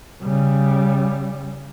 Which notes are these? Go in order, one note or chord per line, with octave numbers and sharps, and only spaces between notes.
C#3 G3